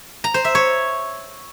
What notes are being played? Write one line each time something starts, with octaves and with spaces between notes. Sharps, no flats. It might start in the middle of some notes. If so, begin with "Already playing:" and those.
A#5
C5
E5
C#5